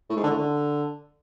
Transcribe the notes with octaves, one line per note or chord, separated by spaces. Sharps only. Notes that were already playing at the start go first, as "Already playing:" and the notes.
A2
G#2
D3
A2
D3